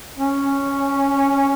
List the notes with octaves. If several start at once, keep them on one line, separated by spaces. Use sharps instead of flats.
C#4